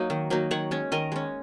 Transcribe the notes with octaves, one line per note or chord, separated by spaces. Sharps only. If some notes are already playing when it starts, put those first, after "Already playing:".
Already playing: F#3 A#3 D#4
D#3
F#3 A#3 D#4
D#3 C#5 F#5
G#3 C#4
D#3 A#4 D#5
G#3 C#4